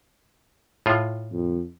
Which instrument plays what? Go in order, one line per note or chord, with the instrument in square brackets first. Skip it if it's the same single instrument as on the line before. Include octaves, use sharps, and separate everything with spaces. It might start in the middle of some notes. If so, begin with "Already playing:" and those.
[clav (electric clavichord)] A2 F4
[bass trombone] F2